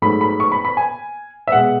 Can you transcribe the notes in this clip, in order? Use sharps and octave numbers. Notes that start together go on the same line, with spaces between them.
G#2 F#3 A3 B5
B5
C#6
B5
B5
G#5
E5
B2 G#3 F#5